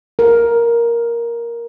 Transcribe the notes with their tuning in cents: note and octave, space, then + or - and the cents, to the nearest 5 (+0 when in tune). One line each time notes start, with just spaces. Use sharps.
A#4 +5